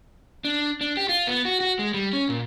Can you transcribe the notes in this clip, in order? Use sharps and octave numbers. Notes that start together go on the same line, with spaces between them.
D4
D4
G4
F4
B3
F#4
F#4
G#3
G3
C#4
A#2